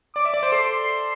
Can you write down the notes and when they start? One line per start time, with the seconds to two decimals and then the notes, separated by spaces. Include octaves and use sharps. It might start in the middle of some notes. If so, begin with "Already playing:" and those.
0.16 D5 D6
0.25 E5
0.34 D5
0.43 C5
0.52 A4 C6